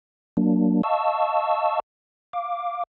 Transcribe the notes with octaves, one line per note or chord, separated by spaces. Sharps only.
F#3 A#3 D4
D#5 F5 A5 C#6 E6
F5 D6